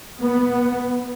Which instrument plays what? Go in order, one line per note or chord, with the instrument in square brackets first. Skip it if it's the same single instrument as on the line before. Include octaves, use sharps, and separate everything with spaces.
[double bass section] B3